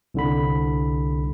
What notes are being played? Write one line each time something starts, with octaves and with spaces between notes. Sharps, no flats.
C2 D3 B5